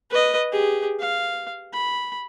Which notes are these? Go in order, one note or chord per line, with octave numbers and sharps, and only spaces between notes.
B4 D#5
G4 G#4
F5
B5